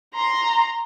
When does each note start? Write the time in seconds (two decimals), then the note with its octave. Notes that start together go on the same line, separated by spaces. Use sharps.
0.14 A#5 C6